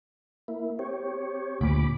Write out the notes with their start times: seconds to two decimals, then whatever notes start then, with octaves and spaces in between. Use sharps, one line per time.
0.48 A#3 E4
0.79 C4 G4 C#5
1.61 D2 A#2 B5 D6